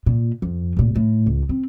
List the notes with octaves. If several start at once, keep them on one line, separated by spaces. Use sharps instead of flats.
A#2
F2
D1 A#2
A2
C#2
C4